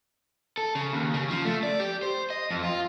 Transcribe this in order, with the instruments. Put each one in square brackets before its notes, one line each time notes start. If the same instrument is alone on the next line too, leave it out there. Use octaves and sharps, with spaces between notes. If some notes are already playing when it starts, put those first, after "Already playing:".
[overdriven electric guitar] A4
C#3
D#2
C#3
F3
A3
D5
G4
C5
D#5
F2
F4